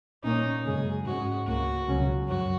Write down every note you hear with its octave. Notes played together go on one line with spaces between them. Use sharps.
A#2 A#3 C#4 D#4
F#2 C#3 G#3 G#4
G#2 G#3 C#4 F#4
C#2 C#3 A#3 F#4
C#2 C#3 F#3 C#4
F#2 F#3 F#4